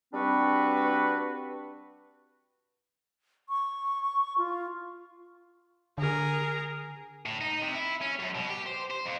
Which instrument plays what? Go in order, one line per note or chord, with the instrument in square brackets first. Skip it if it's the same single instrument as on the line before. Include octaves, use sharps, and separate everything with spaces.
[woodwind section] G3 C4 D4 F#4 B4
[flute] C#6
F4
[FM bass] D3 [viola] G#4 A#4
[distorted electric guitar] A2
D#4
C3
E4
C#4
F#2
B2
G4
C5
C5
F2